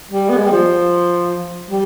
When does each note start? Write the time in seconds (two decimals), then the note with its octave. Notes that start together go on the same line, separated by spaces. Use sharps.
0.11 G3
0.29 B3
0.37 G#3
0.44 G3
0.52 F3
1.70 G3